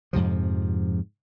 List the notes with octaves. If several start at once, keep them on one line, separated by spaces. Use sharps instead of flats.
F2 G#2 C3 F3